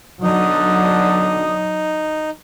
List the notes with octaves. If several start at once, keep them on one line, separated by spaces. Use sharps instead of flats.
B1 D3 F#3 D4 D#4 D#6